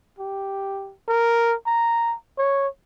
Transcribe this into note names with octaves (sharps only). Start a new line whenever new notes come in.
G4
A#4
A#5
C#5